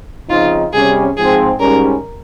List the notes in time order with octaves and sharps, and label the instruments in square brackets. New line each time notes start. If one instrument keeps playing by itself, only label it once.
[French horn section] C#3 F3 C4 D#4 [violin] F4
[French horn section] C3 G3 C#4 [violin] G#4
[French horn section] G#2 F3 C4 [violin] G#4
[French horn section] G#2 G3 C#4 [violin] A#4